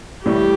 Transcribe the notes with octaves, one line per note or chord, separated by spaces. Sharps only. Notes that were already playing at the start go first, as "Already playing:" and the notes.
A1 A2 G3 G4